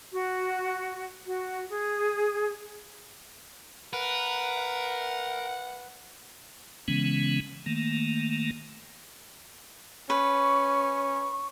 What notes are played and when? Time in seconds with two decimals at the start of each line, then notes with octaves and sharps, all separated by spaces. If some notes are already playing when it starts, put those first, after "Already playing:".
0.11 F#4
1.25 F#4
1.70 G#4
3.93 A#4 B4 F#5
6.88 C#3 E3 G#3 B3 C#4
7.66 D#3 A3 A#3
10.10 C#4 B4 C#6